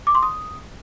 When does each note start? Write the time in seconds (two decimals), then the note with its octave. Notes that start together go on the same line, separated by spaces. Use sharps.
0.07 D6
0.15 C6
0.23 D#6